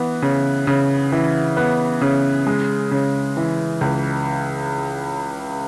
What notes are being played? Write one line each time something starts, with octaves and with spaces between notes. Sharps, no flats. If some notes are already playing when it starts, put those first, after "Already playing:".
Already playing: E3 B3
C#3
C#3
E3
B3
C#3
G#3
C#3
E3
C#2